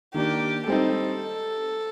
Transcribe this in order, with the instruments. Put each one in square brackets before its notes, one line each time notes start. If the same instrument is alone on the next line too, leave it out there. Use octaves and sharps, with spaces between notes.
[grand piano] D#3 A#3 D4 [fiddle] G4
[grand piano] G3 C4 D#4 [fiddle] A4